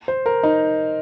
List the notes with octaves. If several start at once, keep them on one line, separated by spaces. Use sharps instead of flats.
C5
A#4
D#4